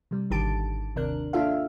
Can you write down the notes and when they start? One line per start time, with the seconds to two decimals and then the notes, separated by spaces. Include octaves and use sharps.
0.11 C3 G3
0.30 G#1 D3 D#3 G4 A5 D7
0.96 D#2 C3 D4 A#4 F#6
1.33 A#3 D4 F4 A4 E5 F5